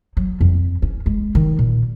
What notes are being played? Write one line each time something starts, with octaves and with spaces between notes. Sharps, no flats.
F#3
F2
C#4
G#3
D#3
A#2